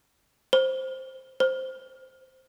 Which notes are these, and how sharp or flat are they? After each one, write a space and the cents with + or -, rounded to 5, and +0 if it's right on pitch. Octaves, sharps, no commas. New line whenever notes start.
C5 +5
C5 +0